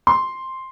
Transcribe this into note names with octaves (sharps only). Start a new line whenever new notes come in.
C6